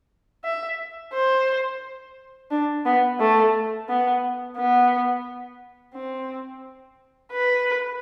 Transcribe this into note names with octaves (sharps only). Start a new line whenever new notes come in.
E5
C5
D4
B3
A3
B3
B3
C4
B4